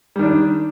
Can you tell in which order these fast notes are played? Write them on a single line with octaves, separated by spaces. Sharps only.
G3 D#3 D4